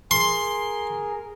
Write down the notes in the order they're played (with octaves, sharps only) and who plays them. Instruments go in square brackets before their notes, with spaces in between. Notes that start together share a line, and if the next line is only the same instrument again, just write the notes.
[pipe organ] G#4 A#4 [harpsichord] C6